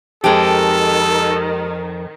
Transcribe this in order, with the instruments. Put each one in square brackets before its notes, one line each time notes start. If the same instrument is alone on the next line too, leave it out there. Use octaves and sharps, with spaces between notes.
[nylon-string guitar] F2 [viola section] D#3 [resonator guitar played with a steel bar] G#3 G4 [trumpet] A4